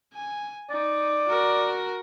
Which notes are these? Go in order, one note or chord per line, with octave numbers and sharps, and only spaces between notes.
G#5
D#4 D5
F#4 A#4